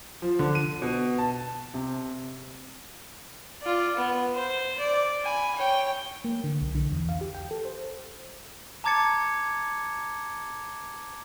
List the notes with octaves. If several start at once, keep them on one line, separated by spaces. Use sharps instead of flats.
F3
D3
D#7
B2
A5
C3
F4 D5
B3
C5
D5
G#5 B5
C#5 G5
A#3
D3
B1
D3
E2
F5
G4
G5
A4
C5
A5 A#5 D6 G#6 A6 C#7